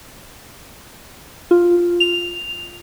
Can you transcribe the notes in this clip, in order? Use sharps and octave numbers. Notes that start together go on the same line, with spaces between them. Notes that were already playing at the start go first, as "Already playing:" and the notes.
F4
F7